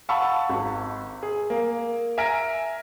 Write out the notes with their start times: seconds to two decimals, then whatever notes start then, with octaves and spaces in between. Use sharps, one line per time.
0.09 F5 F#5 A5 B5 C#6 E6
0.50 G#1
1.23 G#4
1.50 A#3
2.18 E5 G#5 A#5 F6 A#6 D7